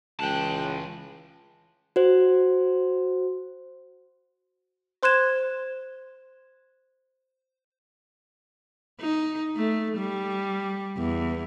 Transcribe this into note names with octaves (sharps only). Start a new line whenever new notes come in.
C#2 E3 G5 A5 F#6
F#4 C5
C5 C6 F#6 G#6 E7
D#4
A3
G3
E2